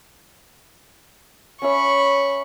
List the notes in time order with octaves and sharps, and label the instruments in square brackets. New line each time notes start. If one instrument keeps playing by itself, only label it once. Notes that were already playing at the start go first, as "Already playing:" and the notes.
[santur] C#4 E5 [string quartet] B5 C#6